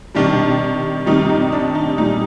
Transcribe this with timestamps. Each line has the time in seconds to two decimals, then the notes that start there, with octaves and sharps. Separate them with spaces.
0.15 C3 D#3 G3 D4
1.06 C3 D#3 G3 D#4
1.29 D#4
1.52 D4
1.75 D#4
1.98 A#2 G3 D#4